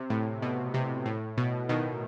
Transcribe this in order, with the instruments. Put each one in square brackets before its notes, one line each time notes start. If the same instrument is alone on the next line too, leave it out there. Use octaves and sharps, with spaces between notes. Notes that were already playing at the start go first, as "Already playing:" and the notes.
Already playing: [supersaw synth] C3
A2
B2
C3
A2
B2
B2 D#3